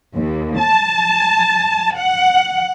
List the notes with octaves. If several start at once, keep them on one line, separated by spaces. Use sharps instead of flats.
D#2
A5
F#5